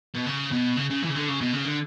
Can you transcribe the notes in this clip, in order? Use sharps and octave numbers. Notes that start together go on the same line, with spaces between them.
B2
C#3
B2
C#3
C#3
E3
C#3
D3
C#3
B2
C#3
D3